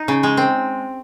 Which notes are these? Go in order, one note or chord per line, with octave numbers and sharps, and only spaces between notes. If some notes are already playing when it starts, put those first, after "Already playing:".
Already playing: D#4
C#3
G#3
C4